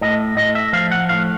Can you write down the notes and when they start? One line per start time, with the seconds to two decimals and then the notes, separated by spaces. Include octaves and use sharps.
0.01 A2 D#5
0.37 A2 D#5
0.55 E5
0.73 F3 F5
0.91 F#5
1.09 A2 F5